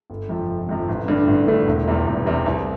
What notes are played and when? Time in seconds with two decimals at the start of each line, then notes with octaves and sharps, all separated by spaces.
0.10 G1
0.29 F2 C3 F3
0.49 G1
0.69 F2 C3 F3
0.88 A1
1.08 G2 D3 A3 D4
1.27 A1
1.47 G2 D3 A3 D4
1.67 E1
1.87 E2 C3 G3
2.07 E1
2.26 E2 C3 G3
2.46 C2